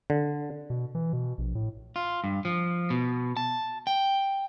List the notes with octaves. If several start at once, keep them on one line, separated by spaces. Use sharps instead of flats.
D3
B2
E3
B2
A#1
A2
F4
G2
F3
B2
A5
G5